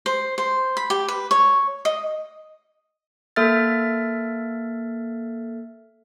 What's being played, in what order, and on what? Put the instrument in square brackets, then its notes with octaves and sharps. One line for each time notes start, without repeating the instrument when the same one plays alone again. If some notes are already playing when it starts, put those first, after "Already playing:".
[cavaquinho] C5
C5
B5
G4
B4
C#5
D#5
[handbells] A#3 A4 E5 F6 A6